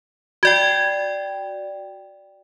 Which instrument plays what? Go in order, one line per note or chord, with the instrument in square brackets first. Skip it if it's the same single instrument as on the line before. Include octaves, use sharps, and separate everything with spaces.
[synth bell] F#4 D5 G5 [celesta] G#6